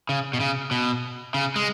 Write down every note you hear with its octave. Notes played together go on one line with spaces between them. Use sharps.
C#3
B2
C#3
B2
C#3
G#3